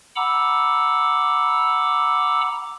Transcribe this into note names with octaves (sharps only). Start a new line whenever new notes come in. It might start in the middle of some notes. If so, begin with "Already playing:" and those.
F#5 A#5 B5 D6 E6